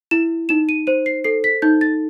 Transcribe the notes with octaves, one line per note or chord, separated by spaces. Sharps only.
E4 E7
D#4 E7
D#7
C5 D#7
C7
A4 C7
B6
D#4 G6
A6